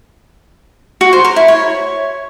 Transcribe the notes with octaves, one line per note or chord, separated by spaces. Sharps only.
F#4
C5
A#4
E4
C#5